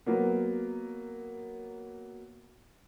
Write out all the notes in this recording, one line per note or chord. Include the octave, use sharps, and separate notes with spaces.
F#3 A#3 B3